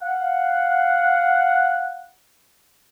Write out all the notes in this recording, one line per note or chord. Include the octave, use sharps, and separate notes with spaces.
F5 F#5